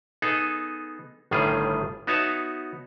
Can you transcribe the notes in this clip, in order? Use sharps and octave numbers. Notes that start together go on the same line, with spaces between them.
B3 D#4 G#4 A4
G1 A2 D#3 G3 F4 G#4
B3 D#4 F#4 C#5 E5 A5